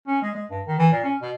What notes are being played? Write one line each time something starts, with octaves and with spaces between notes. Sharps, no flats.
C#4
G#3
G#3
G2
D#3
E3
A#2
C#4
B2